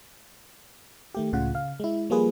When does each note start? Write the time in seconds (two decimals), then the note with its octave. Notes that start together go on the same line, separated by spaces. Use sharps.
1.15 D#3 A3 G4
1.33 C#2 A2 C#3 F4 F#5
1.54 C#3 F5
1.80 G#3 E4
2.10 F3 G3 A#3 F4 G#4 B4